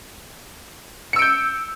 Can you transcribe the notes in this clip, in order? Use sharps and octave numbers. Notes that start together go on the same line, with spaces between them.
E6 G6 C#7 D7